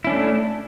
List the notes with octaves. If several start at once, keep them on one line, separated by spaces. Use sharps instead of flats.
A3 C#4 D4 E4